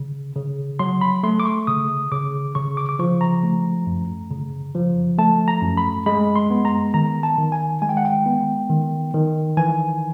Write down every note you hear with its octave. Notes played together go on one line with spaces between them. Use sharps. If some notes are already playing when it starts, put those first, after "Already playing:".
Already playing: C#3
C#3
F#3 C6
B5
A3 C6
D6
C#6
C#3 D#6
C#3 D6
C#3 C#6
D6
D6
F3 C#6
A#5
A3
F#2
C#3
F3
A3 A5
A#5
F#2
B5
G#3 B5
C6
B3
A#5
D#3 A#5
A5
D#3
G#5
G#3 G#5
G5
F#5
G5
B3
D#3
D#3
E3 G#5